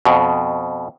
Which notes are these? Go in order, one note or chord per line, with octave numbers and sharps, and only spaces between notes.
F2 B2